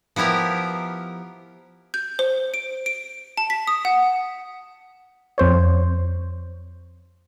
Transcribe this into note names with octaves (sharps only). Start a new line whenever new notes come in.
F3 B3 E4 G4 A#4
G6
C5
D7
D7
A5
B6
D#6
F#5
F2 C5 C#5